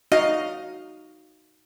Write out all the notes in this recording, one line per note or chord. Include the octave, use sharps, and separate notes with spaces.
D#4 F#4 D#5 F5